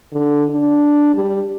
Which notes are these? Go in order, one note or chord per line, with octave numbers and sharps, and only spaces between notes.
D3
D4
G3